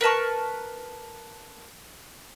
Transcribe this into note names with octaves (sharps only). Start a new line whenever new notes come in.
A#4 B4 A5 C#6